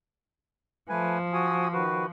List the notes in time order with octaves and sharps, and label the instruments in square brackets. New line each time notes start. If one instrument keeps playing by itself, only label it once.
[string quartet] F3 [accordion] A3 B4 G#5
[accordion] F#4 G#5 D#6
D#3 F#4 B4